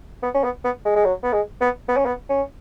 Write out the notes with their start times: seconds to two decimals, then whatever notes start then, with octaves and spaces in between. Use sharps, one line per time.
0.23 B3
0.34 C#4
0.44 B3
0.64 B3
0.85 G#3
0.96 G#3
1.05 F#3
1.23 B3
1.33 G#3
1.61 B3
1.88 B3
1.97 C#4
2.05 B3
2.29 C#4